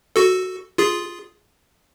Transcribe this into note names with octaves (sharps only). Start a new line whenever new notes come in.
F#4 A4
F4 G#4